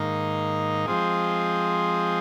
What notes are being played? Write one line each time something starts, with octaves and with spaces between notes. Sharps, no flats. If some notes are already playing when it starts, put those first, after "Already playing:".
Already playing: G#2 D#3 A#3 D#4
F3 G#3 C4 F4 G#4